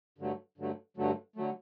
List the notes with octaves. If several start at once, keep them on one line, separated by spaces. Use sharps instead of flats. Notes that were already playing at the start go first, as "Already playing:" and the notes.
G2 D3 F#3 A3
G2 D3 F#3 A3
G2 D3 F#3 A3
D3 F#3 A3